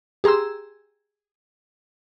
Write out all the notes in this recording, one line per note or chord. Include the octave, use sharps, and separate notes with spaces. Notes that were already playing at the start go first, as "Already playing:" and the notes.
G4 G#4 A#5 C6 E6